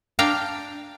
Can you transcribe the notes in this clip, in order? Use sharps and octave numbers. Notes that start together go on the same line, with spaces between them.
D4 F5 G5 A#5